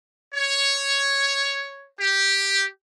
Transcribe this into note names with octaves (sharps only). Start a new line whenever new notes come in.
C#5
G4